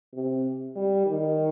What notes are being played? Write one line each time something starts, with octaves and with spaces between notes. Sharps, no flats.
C3
G3
D#3